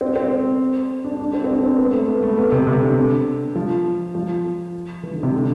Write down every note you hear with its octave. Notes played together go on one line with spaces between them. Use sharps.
C4
C4
D4
D4
C4
C4
D4
C4
B3
A3
B3
A3
B3
C3
C3
D3
F3
F3
E3
D3
C3
D3